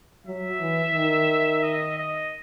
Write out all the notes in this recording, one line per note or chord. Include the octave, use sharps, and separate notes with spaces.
F#3 E5
E3
D#3
D#5
D#5